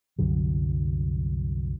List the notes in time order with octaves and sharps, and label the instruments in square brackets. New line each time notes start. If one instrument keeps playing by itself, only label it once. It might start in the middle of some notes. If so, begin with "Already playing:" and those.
[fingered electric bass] C2 F#2 D3 F#3